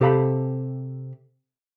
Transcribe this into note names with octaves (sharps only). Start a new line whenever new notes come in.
C3 G4 A4 F5 B5